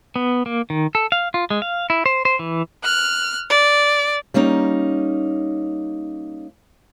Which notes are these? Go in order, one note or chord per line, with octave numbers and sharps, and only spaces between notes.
B3
A#3
D#3
A4
F5
F4
G#3
F5
E4
C5
C5
E3
F6 F#6
D5
G3 A#3 C#4 D#4